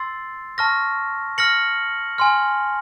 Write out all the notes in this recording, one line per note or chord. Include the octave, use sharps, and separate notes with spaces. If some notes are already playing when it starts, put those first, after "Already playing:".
Already playing: C6 E6 A6 C7
A5 C#6 F6 A#6
F6 A#6 C#7 F#7
G#5 C6 F6